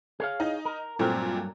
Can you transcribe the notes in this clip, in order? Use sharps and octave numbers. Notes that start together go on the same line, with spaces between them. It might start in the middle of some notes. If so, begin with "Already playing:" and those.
G#4 C#5 F5
D#4 D#5
A#4
G2 A#2 F#3 A3 C4 A#4